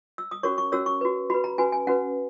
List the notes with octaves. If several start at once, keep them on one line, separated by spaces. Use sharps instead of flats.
E6
D#6
C#4 F#4 A#4 C#5 C#6
C#6
C#4 F#4 A#4 C#5 E6
C#6
F#4 B4
F#4 B4 B5
A#5
C#4 F#4 B4 G#5
G#5
C#4 F#4 B4 F#5